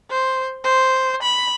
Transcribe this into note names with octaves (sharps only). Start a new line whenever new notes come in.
C5
C5
B5